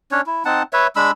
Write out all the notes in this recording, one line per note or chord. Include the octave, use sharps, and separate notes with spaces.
C#4 D4 C#5
E4
C4 D#4 F#5 A5
B4 C#5 E5
G#3 D4 B5 E6